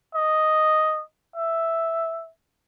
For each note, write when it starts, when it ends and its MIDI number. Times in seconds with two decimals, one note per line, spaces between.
0.15 1.03 75
1.36 2.30 76